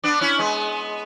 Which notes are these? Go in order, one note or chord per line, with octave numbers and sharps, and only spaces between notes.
B3 D4
C#4 E4
G#3 B3